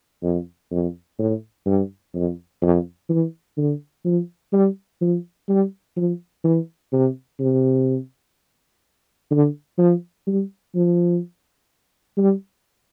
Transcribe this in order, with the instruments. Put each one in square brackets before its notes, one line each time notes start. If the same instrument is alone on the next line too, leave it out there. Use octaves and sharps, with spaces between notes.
[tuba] F2
F2
A2
G2
F2
F2
E3
D3
F3
G3
F3
G3
F3
E3
C3
C3
D3
F3
G3
F3
G3